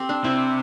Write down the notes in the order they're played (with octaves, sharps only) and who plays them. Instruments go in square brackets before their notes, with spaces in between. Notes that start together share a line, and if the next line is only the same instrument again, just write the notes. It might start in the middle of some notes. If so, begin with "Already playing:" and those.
Already playing: [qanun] C4 G4
D4
[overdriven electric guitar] C3 [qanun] E4